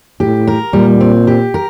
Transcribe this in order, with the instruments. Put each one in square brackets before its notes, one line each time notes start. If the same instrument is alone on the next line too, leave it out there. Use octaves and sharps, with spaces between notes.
[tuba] A2 [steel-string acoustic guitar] G4
[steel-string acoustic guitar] A#4
[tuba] A#2 [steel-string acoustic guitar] G3
[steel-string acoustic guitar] C4
G4
A#4